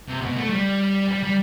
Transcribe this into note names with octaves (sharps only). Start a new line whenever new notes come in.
C3
B2
A3
G3
G3
G3